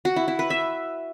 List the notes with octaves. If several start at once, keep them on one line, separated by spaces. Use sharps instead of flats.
F#4
E4
E4
B4
E5